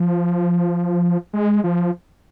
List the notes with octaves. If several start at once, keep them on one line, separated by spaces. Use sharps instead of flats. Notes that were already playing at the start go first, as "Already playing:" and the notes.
Already playing: F3
G#3
F3